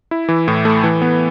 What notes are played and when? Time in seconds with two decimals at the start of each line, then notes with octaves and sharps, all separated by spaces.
0.11 E4
0.28 E3
0.48 A2
0.65 A3
0.84 E3
1.02 B3